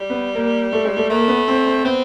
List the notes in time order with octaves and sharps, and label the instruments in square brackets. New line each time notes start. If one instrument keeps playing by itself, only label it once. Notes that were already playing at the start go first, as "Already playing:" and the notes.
Already playing: [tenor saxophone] G3
[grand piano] B3
A#3
A3
G#3
A3
[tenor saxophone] A3 [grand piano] A#3
[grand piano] B3
C4
C4
[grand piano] B3 [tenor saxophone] C4